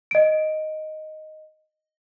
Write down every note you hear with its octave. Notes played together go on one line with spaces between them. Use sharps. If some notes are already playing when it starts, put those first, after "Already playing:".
D#5 D7